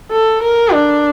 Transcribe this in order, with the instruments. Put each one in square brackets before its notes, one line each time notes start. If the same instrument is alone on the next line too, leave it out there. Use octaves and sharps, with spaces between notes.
[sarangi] A4
A#4
D4